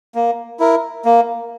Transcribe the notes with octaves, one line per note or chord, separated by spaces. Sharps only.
A#3
E4 A#4
A#3